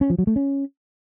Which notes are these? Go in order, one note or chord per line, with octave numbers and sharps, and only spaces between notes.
C#4
F3
F#3
A3
C#4